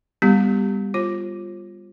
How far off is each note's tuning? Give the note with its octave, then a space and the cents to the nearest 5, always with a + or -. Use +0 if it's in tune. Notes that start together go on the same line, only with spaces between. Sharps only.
G3 +25 B3 +0 G4 +0
F4 +0 C5 +45